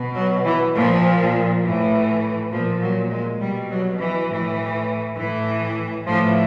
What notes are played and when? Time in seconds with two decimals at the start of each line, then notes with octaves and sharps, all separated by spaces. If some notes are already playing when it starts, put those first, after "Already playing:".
Already playing: B2
0.15 F#3
0.44 E3
0.75 A#2 F3
1.63 A2 E3
2.51 A#2 F3
2.82 F#3
3.10 G#3
3.40 B2 G3
3.70 F#3
4.00 E3
4.29 A2 E3
5.17 A2 E3
6.07 A2 E3 F3